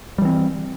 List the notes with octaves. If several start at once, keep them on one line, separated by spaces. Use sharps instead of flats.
E3 G3 C4